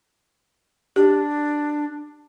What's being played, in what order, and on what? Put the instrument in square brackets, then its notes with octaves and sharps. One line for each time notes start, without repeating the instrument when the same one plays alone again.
[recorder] D4 [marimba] G4